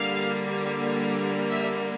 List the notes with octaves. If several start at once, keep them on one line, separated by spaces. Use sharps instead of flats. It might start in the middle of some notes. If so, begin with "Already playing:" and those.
Already playing: D3 G3 A#3 F5
E5